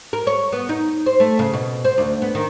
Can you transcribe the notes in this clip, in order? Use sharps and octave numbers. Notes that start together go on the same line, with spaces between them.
A#4
C#5
B3
D#4
C5
A3
C#3
B2
C5
D2
B3
D#3